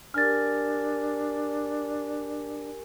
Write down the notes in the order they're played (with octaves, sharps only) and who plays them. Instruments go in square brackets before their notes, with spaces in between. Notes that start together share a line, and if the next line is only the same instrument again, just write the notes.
[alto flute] D4 [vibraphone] G4 A#4 G#5 [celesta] F6 A6